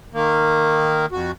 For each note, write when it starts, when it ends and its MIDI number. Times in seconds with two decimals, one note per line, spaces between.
0.14 1.06 51
0.14 1.06 58
1.12 1.31 41
1.12 1.31 66